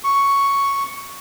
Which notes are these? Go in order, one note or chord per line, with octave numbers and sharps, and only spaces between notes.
C#6